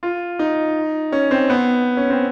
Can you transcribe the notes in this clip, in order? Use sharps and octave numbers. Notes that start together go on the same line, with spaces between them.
F4
D#4
C#4
C4
B3
C#4
C4